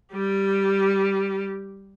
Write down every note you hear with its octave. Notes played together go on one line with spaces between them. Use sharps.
G3 G4